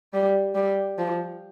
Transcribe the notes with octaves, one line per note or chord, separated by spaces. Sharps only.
G3
G3
F3